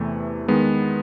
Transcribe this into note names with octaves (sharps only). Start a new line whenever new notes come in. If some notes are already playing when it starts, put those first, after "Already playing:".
Already playing: E2 C3 E3 A3
D#3 G#3 B3